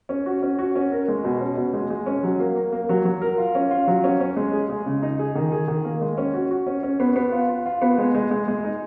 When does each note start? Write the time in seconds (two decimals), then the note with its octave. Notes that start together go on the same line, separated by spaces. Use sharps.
0.09 C#4
0.26 F#4
0.43 C#4
0.59 F#4
0.76 C#4
0.92 A#4
1.08 G#3
1.24 B2
1.41 C#4
1.57 B2
1.74 G#3
1.90 G#3
2.06 C#4
2.23 F#3
2.39 A#3
2.56 A#3
2.72 A#3
2.89 F#3
3.05 F#3
3.22 A#4
3.38 F4
3.55 C#4
3.71 F4
3.87 F#3
4.04 C#4
4.20 C#4
4.37 G#3
4.53 G#4
4.70 G#3
4.86 C#3
5.02 D#4
5.19 G#4
5.35 D#3
5.52 G#4
5.68 D#3
5.85 A#3
6.01 G#3
6.18 C#4
6.33 F#4
6.51 F#4
6.67 C#4
6.83 C#4
7.00 B3
7.16 B3
7.32 F4
7.49 F4
7.66 F4
7.82 B3
7.98 G#3
8.15 G#3
8.31 G#3
8.48 G#3
8.64 D#4